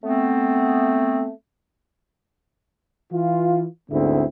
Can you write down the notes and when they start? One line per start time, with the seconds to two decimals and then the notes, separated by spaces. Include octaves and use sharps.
0.03 A3 B3 C4
3.12 E3 F4
3.90 D2 G#2 D3 B3 C4 E4